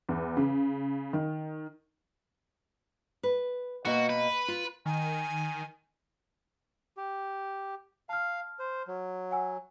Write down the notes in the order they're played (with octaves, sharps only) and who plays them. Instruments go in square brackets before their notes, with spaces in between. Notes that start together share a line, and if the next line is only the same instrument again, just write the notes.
[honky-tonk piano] E2
C#3
D#3
[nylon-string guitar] B4
[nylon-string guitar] B2 A#3 D#5 [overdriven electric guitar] F#4
[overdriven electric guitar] B4
[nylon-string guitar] F4
[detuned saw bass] D#3 [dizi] G#5
[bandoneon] G4
[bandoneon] F5 [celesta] A5 F6
[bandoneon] C5
F#3
[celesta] F#5 G#5 E6